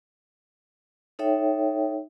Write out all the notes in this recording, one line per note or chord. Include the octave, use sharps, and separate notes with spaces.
D#4 A4 C#5 E5 G5